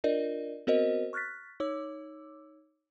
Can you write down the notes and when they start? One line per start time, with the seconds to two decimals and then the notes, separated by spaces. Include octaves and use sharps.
0.04 D4 F4 A#4 D5 D#5
0.67 B3 C4 F#4 A#4 C5 D#5
1.13 C#6 F6 F#6 A6 B6
1.60 D#4 C#5 D6 E6